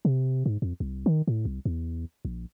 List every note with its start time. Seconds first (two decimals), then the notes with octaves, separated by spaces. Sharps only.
0.05 C3
0.46 G#2
0.62 F2
0.80 C2
1.06 D#3
1.27 A2
1.45 C2
1.65 E2
2.25 A#1